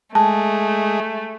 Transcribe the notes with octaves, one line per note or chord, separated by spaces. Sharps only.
G#3 A3 G#4 A5